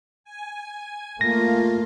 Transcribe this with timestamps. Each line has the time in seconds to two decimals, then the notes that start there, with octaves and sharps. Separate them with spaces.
0.24 G#5
1.21 A3 A#3 F4 A#6